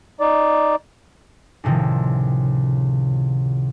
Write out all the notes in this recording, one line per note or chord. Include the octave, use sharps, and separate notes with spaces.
D#4 D5
C#2 A2 C3 D#3 F3